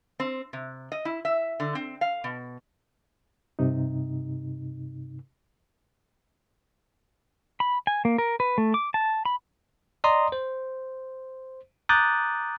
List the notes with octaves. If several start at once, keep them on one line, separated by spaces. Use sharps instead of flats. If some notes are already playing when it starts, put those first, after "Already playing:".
C4
C3
D#5
E4
E5
D3
C4
F5
B2
G2 C3 D#4
B5
G#5
A#3
A#4
B4
A3
D6
A5
B5
D5 D#5 A#5 C6 D#6
C5
A#5 D6 D#6 F#6 G6 A6